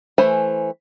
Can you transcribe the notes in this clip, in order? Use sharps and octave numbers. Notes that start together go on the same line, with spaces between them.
E3 A3 C5 G#5 B5